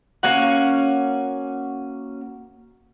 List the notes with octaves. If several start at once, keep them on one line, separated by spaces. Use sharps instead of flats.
A#3 C#4 F#4 F#5